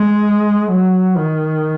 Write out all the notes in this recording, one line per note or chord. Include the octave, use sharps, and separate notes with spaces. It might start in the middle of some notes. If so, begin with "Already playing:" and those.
Already playing: G#3
F#3
D#3